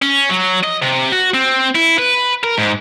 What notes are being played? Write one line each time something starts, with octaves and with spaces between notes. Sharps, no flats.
C#4
F#3
D#5
C3
F#4
C4
E4
B4
A#4
G#2